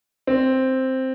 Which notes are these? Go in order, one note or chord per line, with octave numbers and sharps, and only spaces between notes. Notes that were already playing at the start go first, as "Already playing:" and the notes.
C4